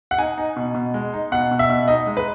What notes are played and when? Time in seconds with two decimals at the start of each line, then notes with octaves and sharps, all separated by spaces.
0.11 F#5
0.18 D#4 G#5
0.38 D#4
0.56 B2
0.74 B2
0.94 G#3
1.13 D#4
1.32 B2 F#5
1.51 B2
1.59 E5
1.70 B2
1.88 D#4 D#5
2.07 G#3
2.17 B4